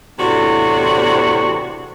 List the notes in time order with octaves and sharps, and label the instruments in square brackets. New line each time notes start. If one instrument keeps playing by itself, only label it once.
[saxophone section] E2 A2 C3 D4 F#4